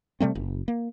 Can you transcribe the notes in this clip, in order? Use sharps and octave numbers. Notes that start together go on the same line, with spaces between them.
C3 G3 A3 C4
F#1
A#3